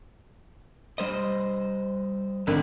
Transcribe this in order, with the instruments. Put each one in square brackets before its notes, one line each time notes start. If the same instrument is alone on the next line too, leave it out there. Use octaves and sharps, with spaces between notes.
[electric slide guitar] G3 C5 D#5
[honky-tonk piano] G#1 [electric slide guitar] D3